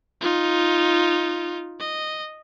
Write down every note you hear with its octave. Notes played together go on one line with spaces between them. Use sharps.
D#4 F4
D#5